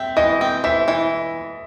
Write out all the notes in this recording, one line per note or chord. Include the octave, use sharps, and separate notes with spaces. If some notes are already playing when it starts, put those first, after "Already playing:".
Already playing: C4 E5
E3 D#5
C4
E3 E5
E3